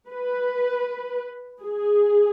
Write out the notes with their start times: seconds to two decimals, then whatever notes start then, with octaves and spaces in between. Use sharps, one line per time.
0.10 B4
1.62 G#4